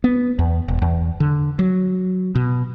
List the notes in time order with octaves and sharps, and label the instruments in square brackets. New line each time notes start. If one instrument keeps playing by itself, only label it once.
[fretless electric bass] B3
E2
E1
E2
D3
F#3
B2